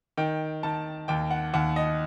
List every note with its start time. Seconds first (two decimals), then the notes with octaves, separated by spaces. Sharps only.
0.17 D#3 G5
0.63 D#3 A5
1.08 D#2 G5
1.31 F#5
1.54 D#2 F#5
1.76 D#5